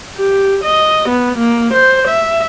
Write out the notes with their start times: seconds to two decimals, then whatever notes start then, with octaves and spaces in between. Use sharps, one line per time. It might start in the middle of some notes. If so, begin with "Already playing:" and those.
0.16 G4
0.64 D#5
1.09 B3
1.38 A#3
1.74 C5
2.08 E5